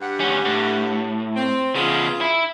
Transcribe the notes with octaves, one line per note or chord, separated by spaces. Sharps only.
G2 G4 F#5
D2 C#4
A2
C4
C#3 B3 F4 G#4
E4